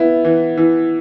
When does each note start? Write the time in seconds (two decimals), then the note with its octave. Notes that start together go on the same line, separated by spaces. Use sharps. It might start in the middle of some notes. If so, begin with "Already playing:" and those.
Already playing: B3 E4
0.25 E3
0.57 E3